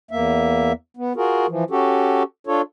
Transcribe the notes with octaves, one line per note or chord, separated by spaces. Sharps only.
E2 A#3 E5
B3
F4 F#4 G#4 A#4
E3 F3
C#4 F#4 G4 A4
D4 F4 A4 C#5